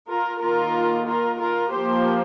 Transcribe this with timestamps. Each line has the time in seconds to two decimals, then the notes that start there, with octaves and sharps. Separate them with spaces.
0.08 F4 A#4
0.40 D#3 A#3 F4 A#4
1.05 F4 A#4
1.39 F4 A#4
1.70 F3 A#3 G4 C5